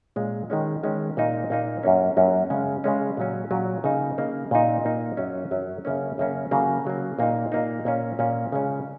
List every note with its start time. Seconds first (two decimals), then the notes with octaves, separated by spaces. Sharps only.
0.16 A#2 G#3 C#4
0.50 D#3 G#3 C#4
0.83 D#3 G#3 C#4
1.17 A#2 A#3 D#4
1.50 A#2 A#3 D#4
1.83 F#2 F#3 A#3 C#4
2.17 F#2 F#3 A#3 C#4
2.50 C#3 G#3 C#4
2.84 C#3 G#3 C#4
3.17 A#2 F#3 C#4
3.51 A#2 F#3 C#4
3.84 C#3 A#3 D#4
4.18 C#3 A#3 D#4
4.51 A#2 A#3 D#4
4.85 A#2 A#3 D#4
5.17 F#2 F#3 C#4
5.51 F#2 F#3 C#4
5.85 F#2 C#3 A#3 C#4
6.18 F#2 C#3 A#3 C#4
6.51 C#3 F#3 A#3
6.85 C#3 F#3 A#3
7.19 A#2 A#3 D#4
7.52 A#2 A#3 D#4
7.85 A#2 A#3 C#4
8.19 A#2 A#3 C#4
8.52 C#3 G#3 C#4